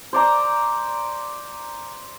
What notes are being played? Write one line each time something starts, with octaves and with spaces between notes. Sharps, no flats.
C5 D5 A#5